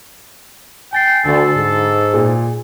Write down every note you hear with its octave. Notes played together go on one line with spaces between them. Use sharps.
G5 G#5 A6 C7
D2 D3 A4
G#2
A#2 G#4